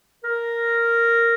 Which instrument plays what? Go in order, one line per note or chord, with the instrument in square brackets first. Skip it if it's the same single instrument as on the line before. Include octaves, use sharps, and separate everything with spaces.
[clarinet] A#4